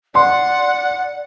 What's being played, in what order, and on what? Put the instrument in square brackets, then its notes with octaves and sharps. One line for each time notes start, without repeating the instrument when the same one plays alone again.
[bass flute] D5 [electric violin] F#5 [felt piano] C6